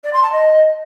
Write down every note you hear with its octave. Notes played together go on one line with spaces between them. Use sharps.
D5
C6
A5
D#5